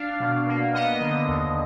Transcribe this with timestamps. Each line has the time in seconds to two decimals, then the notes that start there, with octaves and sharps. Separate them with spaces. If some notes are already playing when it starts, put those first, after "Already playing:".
Already playing: D4 F5
0.20 B2
0.47 A#3
0.74 B3 D#5
1.01 D3
1.28 D#2